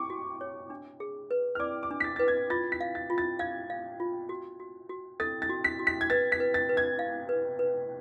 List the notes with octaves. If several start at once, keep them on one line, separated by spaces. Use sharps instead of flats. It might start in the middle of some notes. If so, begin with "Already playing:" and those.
Already playing: C#6 D6
F#4
C#5
D4
G#4
B4
F6
D5 D6
D6
D4
B6
A6
B4 A6
G#6
F4 A6
B6
F5
A6
F4
A6
F5 G#6
F5
F4
F#4
F#4
F#4
A4 A6
A6
F#4
B6
F#4
B6
G#6
B4 A6
B6
B4
A6
B4
G#6
F5
B4
B4